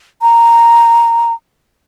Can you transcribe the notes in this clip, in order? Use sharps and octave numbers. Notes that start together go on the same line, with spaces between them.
A#5